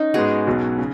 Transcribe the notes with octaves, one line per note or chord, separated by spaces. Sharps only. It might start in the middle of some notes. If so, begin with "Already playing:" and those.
Already playing: C#4 D#4
G#2 G#3 B3 F#4 G#4
B1 B2 F#3 B3
C#3